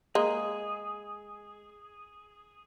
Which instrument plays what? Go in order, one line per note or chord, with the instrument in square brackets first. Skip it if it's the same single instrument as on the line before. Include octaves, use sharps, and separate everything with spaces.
[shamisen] G#3 A#3 [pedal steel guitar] G#4